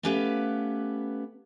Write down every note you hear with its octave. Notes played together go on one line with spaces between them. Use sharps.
A3 B3 C#4 G4 B4 F5